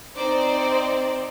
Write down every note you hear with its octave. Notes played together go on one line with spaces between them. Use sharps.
C4 D#4 C5 D5